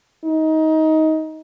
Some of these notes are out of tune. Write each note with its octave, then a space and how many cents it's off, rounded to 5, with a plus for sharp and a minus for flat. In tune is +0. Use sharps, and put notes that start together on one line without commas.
D#4 +20